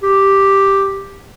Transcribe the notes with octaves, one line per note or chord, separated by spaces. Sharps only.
G4